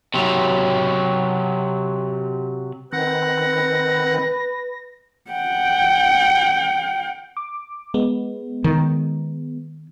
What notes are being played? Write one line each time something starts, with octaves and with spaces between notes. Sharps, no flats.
C3 F#3
D#3 C4 B4 F#5 A#6
F#5 G5
D6
G#3 B3
D#3